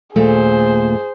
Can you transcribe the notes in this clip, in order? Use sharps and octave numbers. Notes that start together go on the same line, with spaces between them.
D#2 A#2 A3 G#4 C5